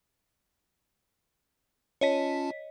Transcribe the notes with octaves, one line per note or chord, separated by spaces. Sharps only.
C#4 F4 C#5 D#5 A5 B6